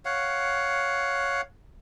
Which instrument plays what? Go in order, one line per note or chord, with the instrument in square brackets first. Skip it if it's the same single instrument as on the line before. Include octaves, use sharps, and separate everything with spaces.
[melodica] C#5 F5 F#5